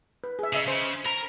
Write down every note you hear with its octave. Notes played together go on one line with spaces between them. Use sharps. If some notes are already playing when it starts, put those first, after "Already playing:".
B4
G#4 E5
C#3 D#5 E5 D#6
C#3 C5
A#4 A#5 B5